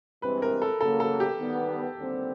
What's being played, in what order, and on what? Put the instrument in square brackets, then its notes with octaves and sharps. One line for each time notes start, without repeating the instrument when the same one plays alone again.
[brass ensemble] G2 E3 G#3 C4 [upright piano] B4
[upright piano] A#4
A4
[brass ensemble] C#3 F#3 A#3 [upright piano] A4
[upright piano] A4
G4
[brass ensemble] D#3 G3 B3
D#2 D3 G3 C4